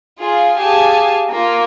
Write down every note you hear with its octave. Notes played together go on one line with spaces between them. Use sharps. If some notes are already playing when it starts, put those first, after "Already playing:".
F4 G#4
G4 G#4 F5 G#5 A5
A#3 F4